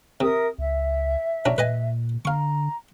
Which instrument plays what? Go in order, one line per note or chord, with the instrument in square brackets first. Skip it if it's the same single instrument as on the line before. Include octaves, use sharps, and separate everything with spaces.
[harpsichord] C3 [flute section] A#4 E5 D#6
[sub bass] C#2 [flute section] E5
[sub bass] B2 [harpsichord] F#3 C#4 D4
[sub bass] A#2 [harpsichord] B4 D#5 G#5
[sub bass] D3 [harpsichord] F5 C#6 [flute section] A#5